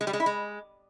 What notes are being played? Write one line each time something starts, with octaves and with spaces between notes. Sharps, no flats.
G#3
G3
G#3
E4
G#3